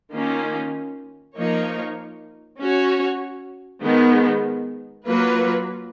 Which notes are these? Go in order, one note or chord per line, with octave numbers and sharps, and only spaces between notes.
D#3 A#3 C#4 F4
F3 A#3 D#4 A#4 C#5
C#4 F#4 C#5
D#3 G#3 B3
F#3 A#3 F4 B4